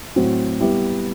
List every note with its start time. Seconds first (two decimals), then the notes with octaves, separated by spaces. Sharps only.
0.16 A2 F#3 C4 F#4
0.60 G3 B3 E4 G4